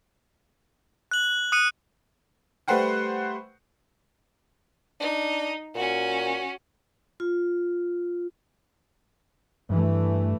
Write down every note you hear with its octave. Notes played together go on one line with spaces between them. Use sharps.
F#6 F#7
D#6 F#6 C#7 D#7
G3 A3 B4 C5 F#5 G5
D4 D#4
A#2 C#4 F#4
F4
G2 E3 A3